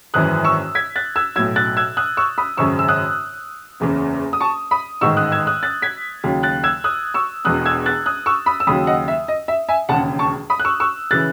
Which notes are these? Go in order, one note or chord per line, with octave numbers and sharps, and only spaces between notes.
G#1 F#2 E3 D#6 F#6
C#6 E6
G#6 B6
F#6 A6
E6 G#6
B1 A2 F#3 E6 G#6
F#6 A6
E6 G#6
D#6 F#6
C#6 E6
B5 D#6
G#1 F#2 C#3 C#6 E6
E6
D#6 F#6
F#1 E2 C#3
D#6
A5 C#6
B5 D#6
A1 G#2 D#3 C#6 E6
D#6 F#6
E6 G#6
D#6 F#6
F#6 A6
G#6 B6
D#2 C#3 F#3
F#6 A6
E6 G#6
D#6 F#6
C#6 E6
E1 E2 B2 D#6 F#6
E6 G#6
F#6 A6
D#6 F#6
C#6 E6
B5 D#6
E6
D#2 C#3 F#3 B5 D#6
D#5 F#5
E5
D#5
E5
E5 G#5
E1 D#2 C#3 F#5 A5
A5 C#6
B5 D#6
F#6
C#6 E6
C#6 E6
C#3 E3 F#6 A6